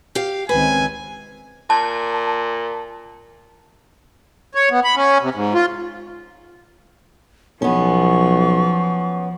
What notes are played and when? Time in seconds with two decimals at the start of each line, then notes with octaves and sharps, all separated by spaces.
0.15 G4 F5
0.49 C#2 D#3 C4 B4 G#5
1.70 A#2 A5
4.55 C#5
4.71 B3
4.84 B5
4.96 C#4
5.22 C3
5.35 G#2
5.54 F4
7.62 B1 F3 B3 C#4 C#6